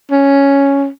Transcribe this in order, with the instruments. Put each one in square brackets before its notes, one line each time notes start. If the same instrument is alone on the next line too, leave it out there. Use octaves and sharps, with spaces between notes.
[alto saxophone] C#4